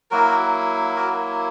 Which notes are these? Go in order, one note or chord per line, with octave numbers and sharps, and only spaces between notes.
F#3 A#3 E4 F#4 A#4
F#4 A#4